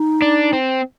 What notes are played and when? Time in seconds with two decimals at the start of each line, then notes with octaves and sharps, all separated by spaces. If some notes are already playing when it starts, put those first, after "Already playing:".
Already playing: D#4
0.22 D4
0.53 C4